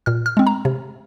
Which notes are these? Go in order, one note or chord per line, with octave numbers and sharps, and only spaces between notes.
A#2 F6
F6
G#3 C4
A#5
C3